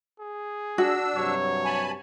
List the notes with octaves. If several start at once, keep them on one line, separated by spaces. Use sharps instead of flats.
G#4
D4 F#4 E6
G2 C3 F#3 C#5
G#5 A5 B5